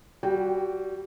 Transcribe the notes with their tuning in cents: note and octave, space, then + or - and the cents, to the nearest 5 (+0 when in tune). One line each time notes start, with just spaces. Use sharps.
G3 -20 F#4 +0 G5 +0